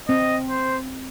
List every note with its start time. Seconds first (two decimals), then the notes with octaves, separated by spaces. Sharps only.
0.08 C4 D#5
0.49 C5